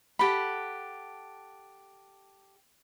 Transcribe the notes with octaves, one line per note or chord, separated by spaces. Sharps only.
G4 A4 F#5 B5